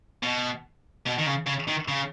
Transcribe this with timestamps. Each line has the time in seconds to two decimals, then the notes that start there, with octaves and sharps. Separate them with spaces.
0.23 B2
1.06 B2
1.19 D#3
1.27 C#3
1.47 C#3
1.68 D#3
1.88 C#3